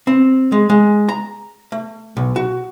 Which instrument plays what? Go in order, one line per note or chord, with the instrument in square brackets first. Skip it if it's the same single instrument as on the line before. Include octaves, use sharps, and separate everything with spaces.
[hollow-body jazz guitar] C4
G#3
G#3
A#5
A3
B1
F#4